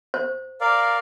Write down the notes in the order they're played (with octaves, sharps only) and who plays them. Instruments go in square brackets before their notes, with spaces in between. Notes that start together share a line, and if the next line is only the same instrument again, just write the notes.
[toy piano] C5
[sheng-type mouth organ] A#4 D5 F5